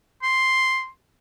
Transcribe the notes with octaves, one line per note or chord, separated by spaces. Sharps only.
C6